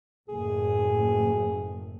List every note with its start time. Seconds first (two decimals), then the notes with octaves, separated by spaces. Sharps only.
0.29 F#1 A2 G#4